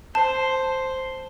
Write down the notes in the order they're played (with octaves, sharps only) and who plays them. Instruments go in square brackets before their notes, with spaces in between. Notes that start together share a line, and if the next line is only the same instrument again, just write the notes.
[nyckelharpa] C5 [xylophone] A5